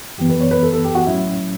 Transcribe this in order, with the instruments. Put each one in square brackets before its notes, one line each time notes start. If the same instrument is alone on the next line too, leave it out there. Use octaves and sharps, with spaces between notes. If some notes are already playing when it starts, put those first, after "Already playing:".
[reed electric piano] F#2 E3 B3 [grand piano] G4
[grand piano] B4
C#5
B4
A4
A4
G4
F#4
[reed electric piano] A2 F#3 C#4 [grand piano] E4